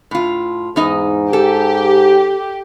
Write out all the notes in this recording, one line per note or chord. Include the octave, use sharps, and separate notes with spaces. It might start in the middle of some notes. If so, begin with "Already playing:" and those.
A2 F4
E2 G#2 D#4 D#5
G4 A4